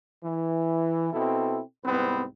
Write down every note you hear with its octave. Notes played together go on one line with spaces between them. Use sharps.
E3
B2 C4 E4 A4
C2 G#2 B3 C4 B4